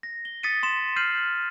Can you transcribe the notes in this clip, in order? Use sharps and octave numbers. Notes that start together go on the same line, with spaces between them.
A#6
G7
D#6 A6 B6 C#7 D#7
C6 E7
F6 G6 C7 D#7 F#7